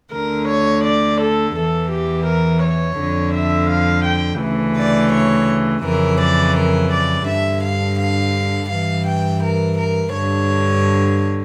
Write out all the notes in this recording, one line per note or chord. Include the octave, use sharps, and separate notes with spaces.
D2 D3 A#4
C#5
D5
A4
E2 E3 A4
G4
A#4
C#5
F2 D3
E5
F5
G5
D2 C#3 E3
D5
C#5
F2 C#3 E3 A#4
D5
A#4
D5
G2 D3 E5
F5
F5
G2 E3 F5
G5
A#4
A#4
G2 D3 C#5